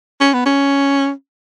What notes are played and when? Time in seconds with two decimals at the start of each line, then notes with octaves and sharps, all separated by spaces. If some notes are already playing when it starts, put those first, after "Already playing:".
0.21 C#4
0.34 B3
0.46 C#4